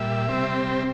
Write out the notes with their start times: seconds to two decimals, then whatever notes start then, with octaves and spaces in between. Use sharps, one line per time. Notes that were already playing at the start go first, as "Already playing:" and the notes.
Already playing: A#2 G3 E5
0.29 C3 G3 C4